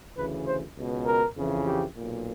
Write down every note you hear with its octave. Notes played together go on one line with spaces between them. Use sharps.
D2 C#3 E3 B4
C5
C#2 B2
A#4
F2 C#3 E3
G4
B1 A#2